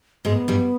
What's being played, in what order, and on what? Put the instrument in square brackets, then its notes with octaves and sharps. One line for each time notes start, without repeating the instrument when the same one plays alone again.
[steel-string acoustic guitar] G#2 G#3 [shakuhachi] B3
[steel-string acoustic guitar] G2 G3